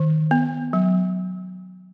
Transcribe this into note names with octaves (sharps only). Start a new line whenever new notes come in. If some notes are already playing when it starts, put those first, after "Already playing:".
Already playing: D#3
B3
F#3